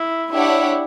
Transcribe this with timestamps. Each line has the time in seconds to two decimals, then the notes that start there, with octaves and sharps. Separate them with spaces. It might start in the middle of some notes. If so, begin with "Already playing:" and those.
Already playing: E4
0.31 D4 E4 G4 C#5 F#5